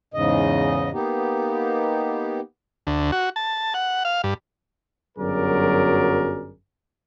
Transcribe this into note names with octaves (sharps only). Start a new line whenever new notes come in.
E2 G#2 C#3 D#5
A#3 B3 D#4 G4
D2
F#4
A5
F#5
F5
G2
G1 F#2 F#3 G#4 A#4 D5